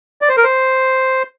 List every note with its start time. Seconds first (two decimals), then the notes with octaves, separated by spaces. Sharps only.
0.22 D5
0.29 C5
0.37 A#4
0.44 C5